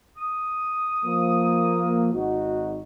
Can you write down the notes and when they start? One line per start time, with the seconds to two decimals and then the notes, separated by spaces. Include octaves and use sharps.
0.18 D#6
1.04 F3 A#3
2.13 G#1 D#4 F#4